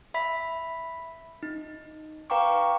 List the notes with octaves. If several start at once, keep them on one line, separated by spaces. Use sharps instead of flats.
E5 B5 B6
D#4
B4 F5 G5 A#5 C#6 D6